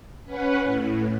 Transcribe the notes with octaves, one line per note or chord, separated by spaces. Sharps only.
C#4 B4 F#5
A2